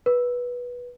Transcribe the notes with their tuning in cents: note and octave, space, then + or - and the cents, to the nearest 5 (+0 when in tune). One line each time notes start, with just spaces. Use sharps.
B4 -15